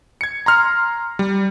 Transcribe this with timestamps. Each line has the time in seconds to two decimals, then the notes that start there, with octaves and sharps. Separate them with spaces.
0.21 G#6 C#7
0.46 A#5 C6 F6
1.19 G3